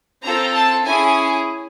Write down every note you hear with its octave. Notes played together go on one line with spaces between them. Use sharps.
C4 F4 A4 A#5
A5
C#4 E4 G#4 G#5